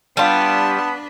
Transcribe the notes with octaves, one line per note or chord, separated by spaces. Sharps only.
G3 B3 D4 F4 B4 A5